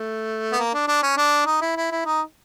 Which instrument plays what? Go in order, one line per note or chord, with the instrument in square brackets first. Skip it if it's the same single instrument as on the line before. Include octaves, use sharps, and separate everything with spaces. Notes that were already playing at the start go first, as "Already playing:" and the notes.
Already playing: [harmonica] A3
B3
A#3
D4
D4
C#4
D4
D#4
E4
E4
E4
D#4